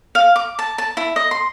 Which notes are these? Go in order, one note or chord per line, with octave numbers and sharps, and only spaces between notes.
F5
D6
A5
A5
E4
D#5
C6